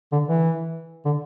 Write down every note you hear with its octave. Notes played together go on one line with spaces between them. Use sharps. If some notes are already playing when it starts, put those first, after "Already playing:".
D3
E3
D3